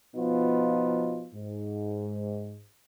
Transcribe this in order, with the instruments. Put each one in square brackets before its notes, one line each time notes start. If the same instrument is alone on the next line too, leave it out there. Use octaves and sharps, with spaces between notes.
[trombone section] B2 F3 B3 D#4 F4
G#2